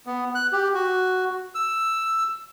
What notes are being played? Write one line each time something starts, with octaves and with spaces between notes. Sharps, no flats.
B3
F#6
G4
F#4
E6